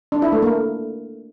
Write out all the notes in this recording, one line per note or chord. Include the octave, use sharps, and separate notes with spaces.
D4
E4
A3
A#3